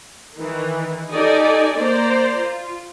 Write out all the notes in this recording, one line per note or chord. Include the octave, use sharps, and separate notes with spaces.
D#3 E3
D#4 G4 A4 D5 D#5 G#5
A#3 C5 D5 A#5
F4